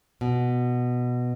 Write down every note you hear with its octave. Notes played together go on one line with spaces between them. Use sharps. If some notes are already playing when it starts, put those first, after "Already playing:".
B2